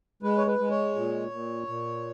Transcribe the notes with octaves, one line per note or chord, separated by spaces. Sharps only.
G#3 B4
C#5
B4
G#3
C#5
A#2
A#2
A#2